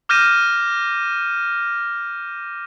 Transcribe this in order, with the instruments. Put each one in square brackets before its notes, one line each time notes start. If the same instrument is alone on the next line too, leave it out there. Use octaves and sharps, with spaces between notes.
[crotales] D6 F6 G6 A#6 D#7 E7